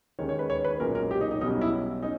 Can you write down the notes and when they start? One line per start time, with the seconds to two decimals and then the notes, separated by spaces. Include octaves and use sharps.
0.19 D#2 D#3 G#3 C#4 C#5
0.29 C#5
0.39 B4
0.50 C#5
0.65 B4
0.80 B1 A#2 G#3 C#4 A#4
0.95 A#4
1.11 G4
1.21 D#4
1.31 D#4
1.41 B1 B2 G3 C#4 D#4
1.61 E4
2.02 C#4 D#4